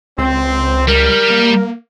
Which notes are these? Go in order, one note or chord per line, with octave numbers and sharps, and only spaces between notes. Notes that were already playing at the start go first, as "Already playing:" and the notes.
C#2 C4
G3 A#4
A#3